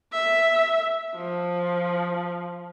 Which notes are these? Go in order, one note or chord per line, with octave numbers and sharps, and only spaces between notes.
E5
F3